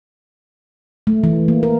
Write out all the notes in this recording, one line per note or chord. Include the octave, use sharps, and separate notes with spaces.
A3
E3
A#3
A#4